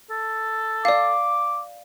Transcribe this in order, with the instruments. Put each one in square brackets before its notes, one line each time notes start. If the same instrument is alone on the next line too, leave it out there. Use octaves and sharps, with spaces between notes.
[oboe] A4
[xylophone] D5 F5 [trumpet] D6